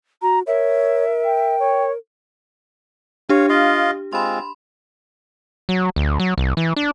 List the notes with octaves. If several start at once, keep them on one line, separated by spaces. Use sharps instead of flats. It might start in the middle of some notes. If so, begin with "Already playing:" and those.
F#4 A#5
A#4 C#5 E5
G5
C#5
D4 G4 C#5 F5
F4 D#5 F5
G#3 C4 F4 B5 C6
F#3
D2
F#3
C2
E3
D4